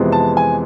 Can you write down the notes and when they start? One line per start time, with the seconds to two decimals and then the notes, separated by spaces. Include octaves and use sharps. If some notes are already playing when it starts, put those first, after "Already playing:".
Already playing: F2 C3 E3 G#3 B3
0.12 A5
0.37 G#5